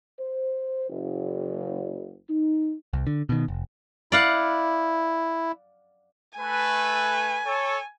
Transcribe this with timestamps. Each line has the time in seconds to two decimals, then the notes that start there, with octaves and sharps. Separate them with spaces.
0.18 C5
0.89 F#1
2.29 D#4
2.93 C2
3.07 D3
3.29 B2 D#3
3.48 F1
4.12 E4 D5 F5 F#5
6.39 A3 B4 G#5
7.45 A4 C#5